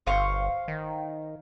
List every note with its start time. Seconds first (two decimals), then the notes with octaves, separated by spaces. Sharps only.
0.07 G1 C5 F5 C#6
0.68 D#3